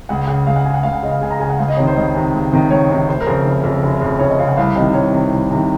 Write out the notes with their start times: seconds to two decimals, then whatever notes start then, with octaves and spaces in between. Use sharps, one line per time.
0.09 C#2 F#5
0.27 C#3 F#5
0.47 C#2 F5
0.56 F#5
0.65 C#3 G#5
0.74 F#5
0.83 C#2 F5
0.93 F#5
1.03 C#3 D#5
1.11 F5
1.21 C#2 G#5
1.31 A#5
1.39 C#3 G#5
1.50 F#5
1.59 C#2 F5
1.68 D#5
1.77 C3 C#5
1.80 D#3
1.87 C5
1.96 C#2 D#5
2.14 C3 D#3
2.33 C#2
2.52 C3 D#3
2.70 C#2 C#5
2.89 C3 D#3
3.08 F1 C5
3.21 A#4
3.26 F2 C#3 C5
3.46 F1
3.64 F2 C#3
3.83 F1
4.01 F2 C#3
4.19 F1 C#5
4.29 D#5
4.39 F2 C#3 F5
4.48 F#5
4.57 C2 F5
4.75 C3 D#3 D#5
4.94 C2 C#5
5.13 C3 D#3
5.31 C2
5.51 C3 D#3